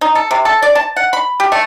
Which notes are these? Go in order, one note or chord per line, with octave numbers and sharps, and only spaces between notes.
D#4
A4
C3
A4
D5
A5
F#5
B5
G4
A3